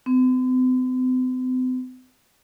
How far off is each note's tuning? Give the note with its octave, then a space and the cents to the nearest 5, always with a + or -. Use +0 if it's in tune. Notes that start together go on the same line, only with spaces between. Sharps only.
C4 -45